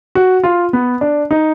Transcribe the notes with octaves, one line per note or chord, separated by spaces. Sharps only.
F#4
F4
B3
D4
D#4